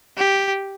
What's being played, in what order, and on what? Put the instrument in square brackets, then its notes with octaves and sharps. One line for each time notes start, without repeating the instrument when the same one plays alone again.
[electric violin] G4